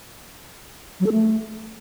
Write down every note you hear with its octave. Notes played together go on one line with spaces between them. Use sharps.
F#3
A4
A3